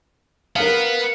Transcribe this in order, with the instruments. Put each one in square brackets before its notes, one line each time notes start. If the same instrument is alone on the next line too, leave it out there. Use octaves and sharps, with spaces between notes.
[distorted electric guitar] B3 [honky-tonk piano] A#4 F5